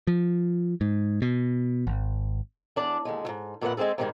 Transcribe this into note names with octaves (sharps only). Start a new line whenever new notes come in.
F3
G#2
B2
G#1
E2 D4 D5
D#2 D3 G#3
D2 G#2
F2 A#2 D3 A3 B4 F#5
G#3 A3 C4 G#4 A4
G#2 C3 D#3 E3 G3 G#3